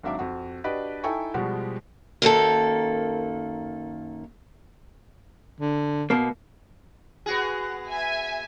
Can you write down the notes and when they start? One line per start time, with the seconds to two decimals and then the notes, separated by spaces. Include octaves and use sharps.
0.03 G#1 F#3 D4 E5 F5 D6
0.19 F2 F#4
0.64 D4 F#4 G4 B4 D5 D#5
1.04 D#4 E4 A4 G5 G#5 C#6
1.34 B2 F3 G3 G#3 F#4 G4
2.22 F#2 D#3 A#3 A4
5.61 D3
6.10 B2 A#3
7.26 B3 F#4 G#4
7.89 E5 G#5